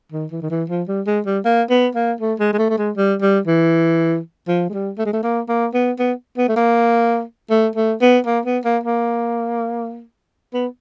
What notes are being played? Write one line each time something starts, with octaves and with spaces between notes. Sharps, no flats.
D#3
E3
D#3
E3
F3
G3
G#3
G3
A#3
B3
A#3
A3
G#3
G#3
A3
A3
G#3
G3
G3
E3
F3
G#3
G3
A3
G#3
A3
A#3
A#3
B3
B3
B3
A3
A#3
A3
A3
B3
A#3
B3
A#3
A#3
B3